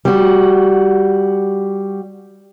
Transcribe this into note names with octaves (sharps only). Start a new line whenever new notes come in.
G3 F#4